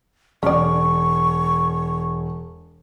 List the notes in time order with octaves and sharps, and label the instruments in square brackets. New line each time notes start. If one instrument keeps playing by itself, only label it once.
[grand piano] E1 [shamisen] C#4 D5 [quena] C#6